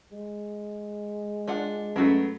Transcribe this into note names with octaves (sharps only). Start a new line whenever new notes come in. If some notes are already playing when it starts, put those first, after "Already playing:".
G#3
D4 F4 F#5
F#2 A3 B3 F#4